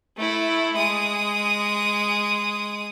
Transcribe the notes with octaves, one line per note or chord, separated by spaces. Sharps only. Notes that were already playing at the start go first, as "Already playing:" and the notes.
A3 E4
G#3 D#6